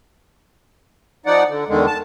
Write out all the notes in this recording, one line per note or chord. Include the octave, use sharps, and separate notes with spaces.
F3 D#4 D5 F#5
D3
E2 D3 D#3 G#3
A5